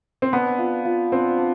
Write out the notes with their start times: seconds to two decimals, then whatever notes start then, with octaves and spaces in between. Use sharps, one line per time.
0.22 C4
0.33 B3 D4
0.59 F4
0.85 F4
1.12 C4 D4
1.38 D4